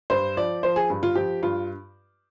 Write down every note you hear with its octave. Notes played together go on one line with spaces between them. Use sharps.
G2 C5
F3 D5
F3 C5
G#4
G2
F4
F3 G4
G2 F4